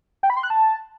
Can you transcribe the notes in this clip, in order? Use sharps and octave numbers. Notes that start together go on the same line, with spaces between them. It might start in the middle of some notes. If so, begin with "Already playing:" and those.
G5
B5
C6
F#6
A5